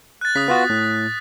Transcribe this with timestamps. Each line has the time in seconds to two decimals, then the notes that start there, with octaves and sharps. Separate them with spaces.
0.21 F#6 A6
0.35 C#3 D#6 B6
0.48 B3 F4 F#4
0.70 A2